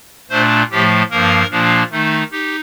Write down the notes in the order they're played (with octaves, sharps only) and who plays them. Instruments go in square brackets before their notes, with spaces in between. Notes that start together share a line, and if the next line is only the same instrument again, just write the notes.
[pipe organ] A#2 A3 D4 C5
A2 F3 A3 G4
G2 F3 A#3 A#4
A#2 F3 A#3 D4
D#3 A3 D#4
D#4 G4